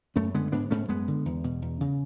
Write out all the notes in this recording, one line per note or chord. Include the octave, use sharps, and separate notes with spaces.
F#2 A3 C#4
D3 G#3 B3
G#2 B3 D4
G#2 A3 C#4
F#2 G#3 B3
D3
E2
B2
E2
C#3